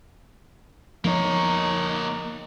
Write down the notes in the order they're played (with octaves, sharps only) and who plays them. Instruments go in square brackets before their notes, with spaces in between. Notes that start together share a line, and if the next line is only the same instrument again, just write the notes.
[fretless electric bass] F3 B3 [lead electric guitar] A#3 C#5 [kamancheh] D#4